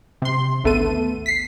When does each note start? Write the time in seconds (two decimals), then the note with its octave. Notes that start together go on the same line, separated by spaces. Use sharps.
0.22 C3 C6
0.64 G#1 D2 A3 B3 A4 D#7
1.26 B6 C7